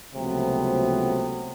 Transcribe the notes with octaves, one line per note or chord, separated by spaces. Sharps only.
C#2 C3 F3 F#3 A3 B3